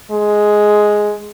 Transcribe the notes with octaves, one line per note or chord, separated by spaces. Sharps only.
G#3